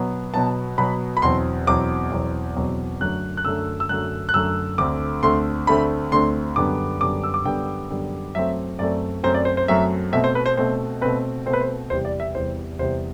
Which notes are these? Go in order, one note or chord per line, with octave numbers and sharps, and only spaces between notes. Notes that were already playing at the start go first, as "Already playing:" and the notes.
Already playing: B2 F#3 B3
B2 F#3 B3 A5
B2 F#3 B3 B5
B5
E2 B2 F#3 C4 C6
E2 B2 F#3 C4 D6
E2 B2 F#3 C4
E2 B2 F#3 C4
F#2 D3 F#3 A3 F#6
F#6
F#2 D3 F#3 A3 E6
E6
F#2 D3 F#3 A3 F#6
F#6
F#2 D3 F#3 A3 E6
D2 D3 A3 C4 D6
D2 D3 A3 C4 C6
D2 D3 A3 C4 B5
D2 D3 A3 C4 C6
F#2 D3 G3 B3 D6
F#2 D3 G3 B3 D6
E6
D6
F#2 D3 G3 B3 G5
F#2 D3 G3 B3
F#2 F#3 A3 C4 E5
F#2 F#3 A3 C4 D5
F#2 F#3 A3 C4 C5
D5
C5
C5
F#2 F#3 A3 C4 E5
B2 A3 C4 E5
C5
B4
C5
B2 A3 C4 C5
B2 A3 C4 B4
B2 A3 C4 C5
B4
C5
B4
E2 C3 G3 C5
D5
E5
E2 C3 G3 C5
E2 C3 G3 C5